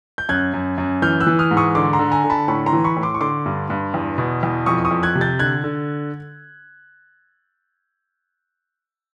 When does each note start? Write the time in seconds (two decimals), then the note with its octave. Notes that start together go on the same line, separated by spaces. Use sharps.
0.18 G6
0.29 F#2 F#6 G#6
0.54 F#2
0.78 F#2
1.02 E3 F6 G6
1.20 E6 F#6
1.27 E3
1.39 D#6 F6
1.51 G#2
1.57 C#6 D#6
1.75 D3 C6 D6
1.93 A#5 C6
1.99 D3
2.12 G#5 A#5
2.24 D3
2.30 A5 B5
2.48 A2 B5 C#6
2.66 A#5 C6
2.72 E3
2.84 B5 C#6
2.96 A2
3.03 C6 D6
3.14 C#6
3.20 D3 C6 D6
3.46 G2
3.70 G2
3.94 E2
4.18 B2
4.43 E2
4.66 F2 C#6 D#6
4.85 C#6 D#6
4.91 F2
5.03 F#6 G#6
5.15 C3
5.21 G6 A6
5.39 D3 F#6 G#6
5.64 D3